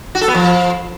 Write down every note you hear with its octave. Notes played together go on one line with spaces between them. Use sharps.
F#4
A4
B3
F3